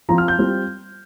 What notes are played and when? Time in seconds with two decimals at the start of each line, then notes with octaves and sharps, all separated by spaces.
0.09 F3 C4 F4 A#5
0.18 F6
0.28 G6
0.38 G3 C4 F4